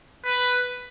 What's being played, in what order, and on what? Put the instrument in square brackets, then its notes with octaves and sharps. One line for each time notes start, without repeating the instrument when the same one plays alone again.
[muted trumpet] B4